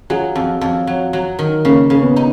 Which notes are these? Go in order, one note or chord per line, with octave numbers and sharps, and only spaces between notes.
F#3 F4 G#4
F2
F2
F#3
F#3
D#3
C#3 A#3 C#4
C#3
B3
D#4